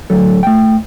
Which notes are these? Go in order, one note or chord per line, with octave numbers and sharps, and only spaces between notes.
A2 D3 F#3 A4
A3 G5